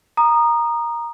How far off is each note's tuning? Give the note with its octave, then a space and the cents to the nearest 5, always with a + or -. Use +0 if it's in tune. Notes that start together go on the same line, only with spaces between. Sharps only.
A#5 +5 D#6 -20